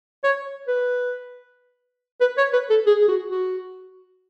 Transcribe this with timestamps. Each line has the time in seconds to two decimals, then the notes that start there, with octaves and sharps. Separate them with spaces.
0.24 C#5
0.68 B4
2.21 B4
2.37 C#5
2.53 B4
2.70 A4
2.87 G#4
3.02 G#4
3.08 F#4
3.31 F#4